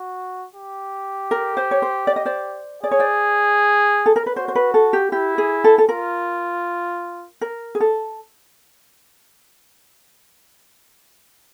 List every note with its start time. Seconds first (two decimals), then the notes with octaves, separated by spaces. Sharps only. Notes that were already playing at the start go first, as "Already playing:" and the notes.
Already playing: F#4
0.55 G4
1.31 A#4
1.57 C5
1.71 C#5
1.82 C5
2.07 D5
2.16 D#5
2.26 C5 D5
2.83 G#4 D5
2.91 C#5
2.99 C5 D5
4.06 A4
4.16 A#4
4.26 B4
4.36 F#4 C5
4.48 C5
4.55 B4
4.74 A4
4.93 G4
5.12 E4 G4
5.38 G#4
5.64 A4
5.78 A4
5.89 F4 A#4
7.41 A#4
7.75 G#4
7.80 A4